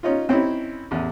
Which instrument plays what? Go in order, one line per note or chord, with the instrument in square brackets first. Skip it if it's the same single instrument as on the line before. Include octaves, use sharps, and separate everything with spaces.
[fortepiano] C#4 D#4 F4
C4 C#4 D#4 E4
A1 E2